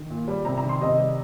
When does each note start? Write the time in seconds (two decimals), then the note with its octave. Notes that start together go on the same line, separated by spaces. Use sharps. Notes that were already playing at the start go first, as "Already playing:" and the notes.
Already playing: D#3
0.10 A#2
0.28 G3
0.45 C3 A#5
0.58 A#5
0.62 D#3
0.69 C6
0.81 C3 D#5
0.98 G3